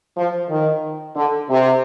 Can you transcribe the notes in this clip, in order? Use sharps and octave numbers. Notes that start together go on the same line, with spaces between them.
F3
D#3
D3
C3